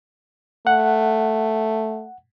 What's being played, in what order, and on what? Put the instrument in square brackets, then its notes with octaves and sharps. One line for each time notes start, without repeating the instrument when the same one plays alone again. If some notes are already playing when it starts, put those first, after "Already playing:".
[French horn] A3 [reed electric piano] F#5